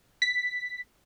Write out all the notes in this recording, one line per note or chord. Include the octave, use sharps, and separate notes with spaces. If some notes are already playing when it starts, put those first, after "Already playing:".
B6